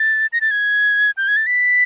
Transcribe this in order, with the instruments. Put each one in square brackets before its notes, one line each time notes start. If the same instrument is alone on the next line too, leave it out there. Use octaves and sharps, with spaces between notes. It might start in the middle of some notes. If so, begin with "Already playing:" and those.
Already playing: [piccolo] A6
A#6
A6
G#6
G6
G#6
A6
B6